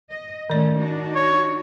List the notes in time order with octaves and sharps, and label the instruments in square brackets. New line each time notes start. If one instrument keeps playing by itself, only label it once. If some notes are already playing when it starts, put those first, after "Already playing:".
[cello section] D#5
[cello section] A2 A3 C#4 [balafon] D#3 D5
[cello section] D4 D#4 F#4
[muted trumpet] C#5